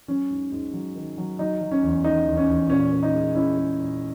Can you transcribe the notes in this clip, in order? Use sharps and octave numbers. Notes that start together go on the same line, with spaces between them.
F#3 C#4
G#2
G#2
F#3
D#3
F#3
F#3 D#4
F#3
C#4
E2
D#3 D#4
E2
C#4
E2
A#2 C#4
A#2
D#4
G#3
G#3 C#4 E4
G#3
A#2